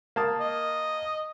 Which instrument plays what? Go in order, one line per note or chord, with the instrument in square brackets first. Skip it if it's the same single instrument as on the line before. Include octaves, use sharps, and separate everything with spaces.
[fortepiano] A#3 A5 D#6
[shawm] D#5